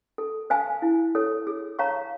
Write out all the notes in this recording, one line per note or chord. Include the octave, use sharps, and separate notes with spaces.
A4
C5 F5 G#5
E4
A4 C#5
G#4
C#5 F5 A#5 C#6